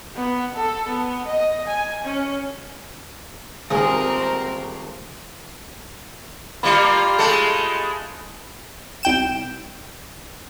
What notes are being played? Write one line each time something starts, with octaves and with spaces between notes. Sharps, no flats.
B3
A4
B3
D#5
G#5
C#4
D#1 G#1 C4 G#4 A#4 G#5 D#6
G3 A#3 F4 B5
G#3 A3 A4
C2 G5 E7